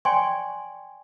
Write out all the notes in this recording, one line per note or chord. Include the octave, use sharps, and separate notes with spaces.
C#5 D5 G5 G#5 C6 C#6